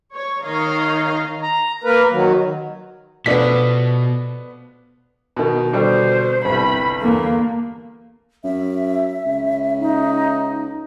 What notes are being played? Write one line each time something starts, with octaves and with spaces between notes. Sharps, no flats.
C#5
D#3 C#5 D#5 F5 A#5
A#5
A#3 A#4 B4
D#3 F#3
B2 F3 A3 B3 D4 B6
B2 D#3
B2 D3 G3 C5
G1 C2 B5
E2 G2 D3 A#3
F#2 E5
C#2
D#4